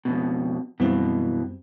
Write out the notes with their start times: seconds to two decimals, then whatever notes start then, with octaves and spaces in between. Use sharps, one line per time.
0.05 F2 G#2 B2
0.80 F#2 B2 E3 G3 C4